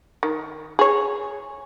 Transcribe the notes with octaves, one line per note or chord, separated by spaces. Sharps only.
D#3
G#4 C#5